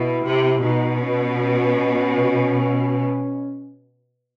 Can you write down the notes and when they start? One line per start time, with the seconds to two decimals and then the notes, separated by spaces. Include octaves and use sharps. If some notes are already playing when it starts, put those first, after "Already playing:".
Already playing: B2 E4
0.23 C3
0.62 B2 D#4
1.01 C#4
1.40 C#4